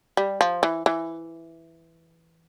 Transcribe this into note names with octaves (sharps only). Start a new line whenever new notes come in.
G3
F3
E3
E3